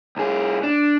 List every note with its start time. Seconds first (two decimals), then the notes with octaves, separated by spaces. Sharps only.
0.17 C2 G#4
0.63 D4